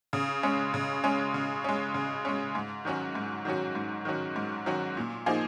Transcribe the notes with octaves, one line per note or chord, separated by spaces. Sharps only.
C#3
G#3 C#4
C#3
G#3 C#4
C#3
G#3 C#4
C#3
G#3 C#4
G#2
D#3 F#3 C#4 F#4
G#2
D#3 F#3 C#4 F#4
G#2
D#3 F#3 C#4 F#4
G#2
D#3 F#3 C#4 F#4
A#2
F3 A#3 D#4 G#4